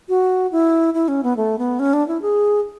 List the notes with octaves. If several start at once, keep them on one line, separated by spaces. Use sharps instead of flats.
F#4
E4
E4
C#4
B3
A3
B3
C#4
D4
E4
G#4